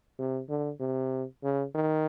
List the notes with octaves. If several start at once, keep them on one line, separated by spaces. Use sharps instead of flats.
C3
D3
C3
C#3
D#3